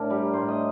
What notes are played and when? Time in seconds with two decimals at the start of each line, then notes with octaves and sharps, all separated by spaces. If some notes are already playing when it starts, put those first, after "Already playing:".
Already playing: A2 D4 A#4
0.10 G3
0.33 A2 C5
0.48 D#5